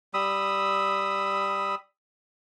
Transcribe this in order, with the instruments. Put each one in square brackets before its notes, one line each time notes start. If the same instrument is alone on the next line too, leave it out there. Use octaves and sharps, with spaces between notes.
[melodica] G3 B5 D#6 E6